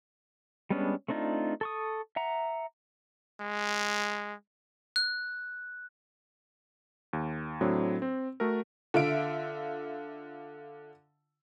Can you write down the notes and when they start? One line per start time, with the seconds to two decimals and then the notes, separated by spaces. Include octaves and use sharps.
0.70 G3 G#3 B3 C#4 D4
1.08 A3 C4 D4 D#4 F4
1.61 A4 C#6 D#6
2.16 E5 F#5 A#5
3.41 G#3
4.96 F#6
7.13 D#2
7.61 A2 F#3 C4 D4
8.02 C4
8.40 A3 F#4 A4 A#4
8.94 D3 F4 E5 D7